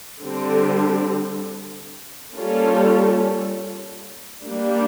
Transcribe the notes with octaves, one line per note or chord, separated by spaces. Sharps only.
D3 G3 C4
G3 A#3 C#4 F4 A4
G3 A#3 D4